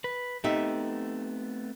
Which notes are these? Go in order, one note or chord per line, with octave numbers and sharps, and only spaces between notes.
B4
A3 B3 C4 D#4 G4 E5